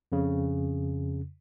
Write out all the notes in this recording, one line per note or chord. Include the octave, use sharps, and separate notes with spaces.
F2 C#3